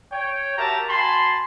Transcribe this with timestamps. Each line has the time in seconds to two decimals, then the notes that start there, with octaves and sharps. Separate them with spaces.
0.11 C#5 G5
0.57 F#4 G4 A#4 E5 A5 A#5
0.88 F#4 G#5 A5 B5 C6